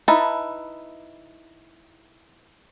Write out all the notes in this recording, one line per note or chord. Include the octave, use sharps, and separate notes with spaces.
D#4 E4 B4 A5